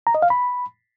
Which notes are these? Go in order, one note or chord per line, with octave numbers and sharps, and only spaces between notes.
A#5
D#5
F5
B5